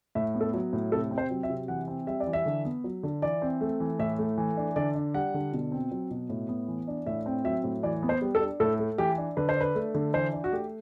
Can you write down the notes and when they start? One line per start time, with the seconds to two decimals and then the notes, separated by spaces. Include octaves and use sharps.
0.15 A2 E5
0.34 B3
0.41 A4
0.54 F#3
0.73 A2
0.92 C3 A4
1.11 C4
1.18 C5
1.30 F#3
1.43 E5
1.50 C3
1.68 E3 F#5
1.88 C4
2.07 G3 E5
2.20 D5
2.27 E3
2.33 E5
2.46 D3
2.65 B3
2.84 F#3
3.03 D3
3.22 E3 D5
3.42 C4
3.61 A3
3.80 E3
3.99 A2 E5
4.19 A3
4.38 E3
4.57 D4
4.76 D3 D5
4.95 D4
5.14 G3 F#5
5.34 D3
5.53 B2
5.72 C4
5.91 F#3
6.11 B2
6.29 A2
6.49 B3
6.68 E3
6.88 D4
7.06 A2 E5
7.26 C4
7.44 F#3 E5
7.64 A2
7.83 E3 D5
8.03 B3
8.09 C5
8.22 G3
8.35 A4
8.41 D4
8.60 A2 A4
8.79 A3
8.98 E3 G4
9.18 D4
9.37 D3 B4
9.49 C5
9.56 D4 B4
9.75 A3
9.95 D3
10.14 E3 C5
10.33 D4
10.44 F#4
10.52 A3 G4